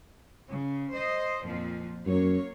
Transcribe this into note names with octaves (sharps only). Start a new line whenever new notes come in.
C#3
C5 D#5
F2 A#2 F3
F#2 F#3 A#3 C#5